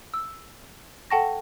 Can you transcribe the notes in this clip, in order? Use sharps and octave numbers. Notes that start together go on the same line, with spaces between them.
E6
A4 F#5 G5 A5 C#6 A#6